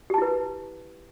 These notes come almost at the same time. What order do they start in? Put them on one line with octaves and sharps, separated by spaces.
G4 A5 E4 B4